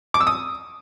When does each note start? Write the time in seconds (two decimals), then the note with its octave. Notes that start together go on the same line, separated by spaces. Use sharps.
0.14 D6
0.21 E6
0.27 D#6